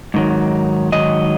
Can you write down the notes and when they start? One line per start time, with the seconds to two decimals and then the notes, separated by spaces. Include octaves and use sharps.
0.14 G#2 D#3 F#3
0.92 G#2 D#3 F#3 D#5